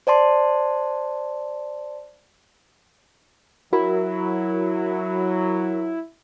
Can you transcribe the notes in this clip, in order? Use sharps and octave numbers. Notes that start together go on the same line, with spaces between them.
C5 D5 A5 C6
F#3 E4 F#4 A#4 B5